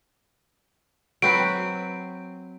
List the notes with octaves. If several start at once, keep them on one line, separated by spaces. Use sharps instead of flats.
F#3 C4 B4 D7